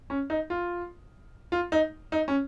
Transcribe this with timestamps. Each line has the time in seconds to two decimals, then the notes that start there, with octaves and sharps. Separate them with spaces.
0.10 C#4
0.30 D#4
0.50 F4
1.52 F4
1.72 D#4
2.12 D#4
2.28 C#4